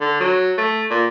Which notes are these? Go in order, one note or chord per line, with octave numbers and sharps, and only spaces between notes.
D3
F#3
A3
A#2